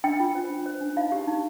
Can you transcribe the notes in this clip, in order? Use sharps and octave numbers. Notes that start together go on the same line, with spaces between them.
D4 G5
F4
C5
D4
C5
D4
D#4 F5
G4
D#4